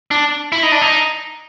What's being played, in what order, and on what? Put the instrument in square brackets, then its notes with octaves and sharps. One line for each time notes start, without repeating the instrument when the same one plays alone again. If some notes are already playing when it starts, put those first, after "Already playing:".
[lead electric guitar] D4
E4
D#4
D4
D#4